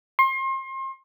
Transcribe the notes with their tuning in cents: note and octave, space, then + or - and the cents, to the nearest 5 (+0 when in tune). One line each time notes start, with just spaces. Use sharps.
C6 +35